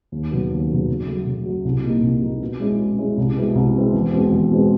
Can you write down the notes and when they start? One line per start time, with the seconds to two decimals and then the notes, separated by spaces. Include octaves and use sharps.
0.12 D#2
0.31 C#3 F#3 B3
0.51 D#2
0.69 C#3 F#3 B3
0.88 C#3
1.08 F#3 A3
1.26 C#3
1.46 F#3 A3
1.65 C2
1.83 A#2 G3 A#3 D#4
2.03 C2
2.22 A#2 G3 A#3 D#4
2.41 B2
2.60 G#3 C#4 E4
2.79 B2
2.98 G#3 C#4 E4
3.18 C2
3.36 B2 G#3 C4 E4
3.55 C2
3.75 B2 G#3 C4 E4
3.94 E2
4.13 B2 G#3 C4
4.32 E2
4.51 B2 G#3 C4